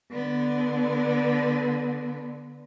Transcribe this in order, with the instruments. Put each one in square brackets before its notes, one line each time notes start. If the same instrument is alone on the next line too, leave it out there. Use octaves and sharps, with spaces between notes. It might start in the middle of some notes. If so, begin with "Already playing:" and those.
[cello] D3 B3